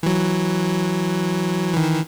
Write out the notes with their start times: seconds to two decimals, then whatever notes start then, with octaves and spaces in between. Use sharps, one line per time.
0.03 E3 F#3
1.73 D#3 E3